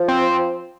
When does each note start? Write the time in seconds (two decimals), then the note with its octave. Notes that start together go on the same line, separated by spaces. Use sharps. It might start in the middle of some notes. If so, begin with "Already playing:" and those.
Already playing: F3
0.08 C4